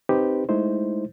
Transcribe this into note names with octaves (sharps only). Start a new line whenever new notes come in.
C4 D#4 G4 B4 C5
G#3 A3 D#4 E4 C5